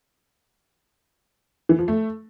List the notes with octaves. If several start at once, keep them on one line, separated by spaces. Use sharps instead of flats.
E3
F3
A3